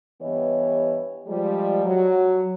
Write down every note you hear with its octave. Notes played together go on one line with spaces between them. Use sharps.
G2 E3 B3 G4 C#5 D#5
F3 G3 G#3
F#3